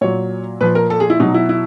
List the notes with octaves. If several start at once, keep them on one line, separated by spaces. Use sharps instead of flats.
A#2 F#3 C#5
A#2 F3 B4
A#4
A4
G#4
E4
B2 F#3 D#4
E4
E4